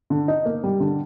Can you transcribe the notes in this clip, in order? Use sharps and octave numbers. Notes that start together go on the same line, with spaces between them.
D3
D#4
A#3
G3
D3